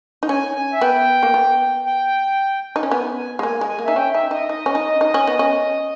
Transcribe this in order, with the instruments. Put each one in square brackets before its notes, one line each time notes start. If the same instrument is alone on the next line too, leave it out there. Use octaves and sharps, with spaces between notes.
[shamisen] D#4
[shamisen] C#4 [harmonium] G#5
[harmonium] G#5
E5
[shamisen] B3 [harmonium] G5
[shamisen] A#3
B3
[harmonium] G5
[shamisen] D#4
C#4
[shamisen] B3 [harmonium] G#5
[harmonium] G#5
[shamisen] G#3
[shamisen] A#3 [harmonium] G#5
[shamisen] G#3
[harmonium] G#5
[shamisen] A#3
[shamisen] D#4 [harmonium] E5
[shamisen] C#4 [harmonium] G5
[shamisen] D#4 [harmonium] E5
[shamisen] D#4 [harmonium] D#5
[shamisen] D#4 [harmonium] D#5
[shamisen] C#4
D#4
D#4
C#4
B3
C#4